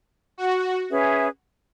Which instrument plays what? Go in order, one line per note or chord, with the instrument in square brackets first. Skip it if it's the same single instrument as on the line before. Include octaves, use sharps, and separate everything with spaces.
[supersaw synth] F#4
[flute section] C#4 G#4 B4 E5